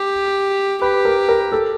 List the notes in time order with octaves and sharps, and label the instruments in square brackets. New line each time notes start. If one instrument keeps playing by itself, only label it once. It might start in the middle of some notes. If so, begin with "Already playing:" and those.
Already playing: [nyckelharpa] G4
[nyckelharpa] G4 [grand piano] B4
[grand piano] A#4
A#4
A4